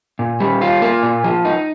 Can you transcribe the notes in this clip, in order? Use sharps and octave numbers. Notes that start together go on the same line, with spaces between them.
A#2
G3
F4
A#3
A#2
F3
D#4